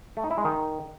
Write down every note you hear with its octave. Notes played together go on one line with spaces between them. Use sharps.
A3
D#4
E4
G#3
D#3